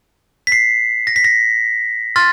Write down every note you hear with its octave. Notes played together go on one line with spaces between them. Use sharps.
B6
C7
A#6
B6
A#6
C6 F6 A6